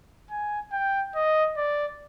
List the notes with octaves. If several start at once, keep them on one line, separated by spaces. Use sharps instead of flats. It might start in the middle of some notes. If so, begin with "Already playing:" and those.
G#5
G5
D#5
D5